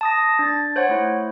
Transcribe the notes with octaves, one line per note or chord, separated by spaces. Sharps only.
A5 D#6 A#6
D4 A6
C5 C#5 F#5
A3 E4